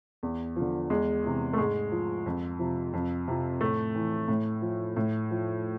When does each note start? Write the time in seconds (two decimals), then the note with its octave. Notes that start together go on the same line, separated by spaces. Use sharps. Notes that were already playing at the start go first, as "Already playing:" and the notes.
0.23 E2
0.56 D3 F3
0.90 E2 G#3
1.24 C3 E3
1.53 A3
1.58 G#2 G#3
1.92 F3
2.26 F2
2.59 C3 F3
2.94 F2
3.28 C3 F3
3.61 A2 A3
3.95 E3
4.28 A2
4.62 F3
4.97 A2
5.31 F3